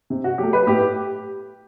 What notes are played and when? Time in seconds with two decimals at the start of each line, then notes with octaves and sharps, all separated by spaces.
0.10 C3
0.24 F#4
0.38 F#3 A3 G4
0.53 B4
0.67 A2 G4